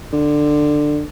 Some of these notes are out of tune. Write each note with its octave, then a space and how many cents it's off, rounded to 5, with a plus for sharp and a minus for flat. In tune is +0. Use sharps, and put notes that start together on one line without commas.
D3 +15